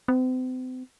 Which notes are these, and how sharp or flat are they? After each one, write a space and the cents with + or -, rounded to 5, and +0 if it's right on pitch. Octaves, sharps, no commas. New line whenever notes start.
C4 -40